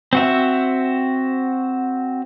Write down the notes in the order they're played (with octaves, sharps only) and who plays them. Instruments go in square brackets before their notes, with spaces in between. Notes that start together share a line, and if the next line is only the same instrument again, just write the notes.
[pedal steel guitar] C4 F#4 E5